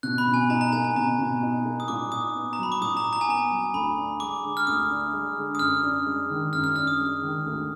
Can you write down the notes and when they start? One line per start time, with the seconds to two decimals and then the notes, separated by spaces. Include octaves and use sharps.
0.03 B2 F#6
0.18 B5
0.27 B2
0.34 G#5
0.50 D#4 A#5
0.61 A#5
0.73 A#3 G#5
0.84 G#5
0.96 B2 A#5
1.19 B2
1.43 D#4
1.65 A#3
1.80 D#6
1.88 A#2 D6
2.12 D#4 D#6
2.35 B3
2.53 A#5
2.58 F#3 B5
2.72 D6
2.81 A#2 D#6
2.97 A#5
3.04 D#4
3.13 A#5
3.21 G#5
3.28 B3 A#5
3.51 F#3
3.74 D2 B5
3.98 D4
4.20 G#3 D6
4.44 D3
4.57 F6
4.67 D2 D#6
4.90 D4
5.13 G#3
5.37 D3
5.55 D#6
5.59 F#2 F6
5.83 D4
6.06 G#3
6.30 D#3
6.53 F#2 F6
6.64 F6
6.76 D4 F6
6.87 D#6
6.99 G#3
7.22 D#3
7.46 D2